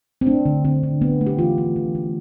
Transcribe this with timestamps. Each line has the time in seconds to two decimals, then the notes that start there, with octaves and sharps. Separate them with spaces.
0.21 C4
0.27 A3 D4
0.46 D3
0.65 D3 C4
0.83 D3
1.01 A3 B3
1.21 A3
1.27 G4
1.39 E3 F4
1.58 A3
1.76 E3
1.95 A3